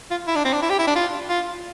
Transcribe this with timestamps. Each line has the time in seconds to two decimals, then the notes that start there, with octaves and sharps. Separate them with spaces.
0.11 F4
0.28 E4
0.36 D4
0.45 C4
0.53 D4
0.62 E4
0.70 G4
0.79 E4
0.87 D4
0.96 F4
1.29 F4